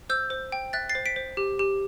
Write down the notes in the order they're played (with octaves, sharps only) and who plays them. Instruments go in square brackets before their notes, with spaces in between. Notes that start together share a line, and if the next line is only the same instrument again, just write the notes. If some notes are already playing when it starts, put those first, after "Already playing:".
[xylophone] C5 E6 G6
C5
G5
E5 F#6 A6
A6 C7
C5
B6 D7
C5
G4
G4